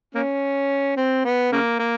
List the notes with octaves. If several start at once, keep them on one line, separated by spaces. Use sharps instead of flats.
A#3 C#4
C4
B3
C#3 A#3
A#3